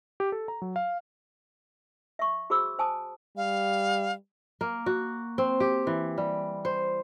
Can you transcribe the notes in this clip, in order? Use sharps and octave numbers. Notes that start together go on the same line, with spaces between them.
G4
A4
A#5
F#3
F5
E5 C#6
F#4 G#4 C5 B5 D6 E6
C5 G#5 A5 D#6
G3 F5
A#3
F#4
C4
G4
E3
G3
C5